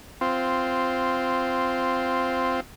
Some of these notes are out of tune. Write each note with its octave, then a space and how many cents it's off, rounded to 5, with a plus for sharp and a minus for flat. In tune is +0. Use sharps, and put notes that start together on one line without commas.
C4 -5 F4 +0